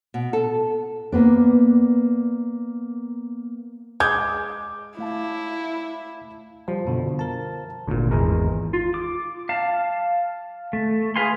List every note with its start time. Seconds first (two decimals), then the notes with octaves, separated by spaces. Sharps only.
0.14 B2
0.33 A4
1.12 A#3 B3 D4
4.00 G#3 D6 G6 G#6
4.99 A3 E4 F5 A5
6.68 F3 G3
6.85 F#2 B2 D3
7.19 A#4 A5
7.87 G#1 D2 A#2
8.11 E2 G#3 A#4
8.73 F4
8.94 D6
9.49 F5 A5
10.73 A3
11.16 G#4 B4 F5 G#5 C6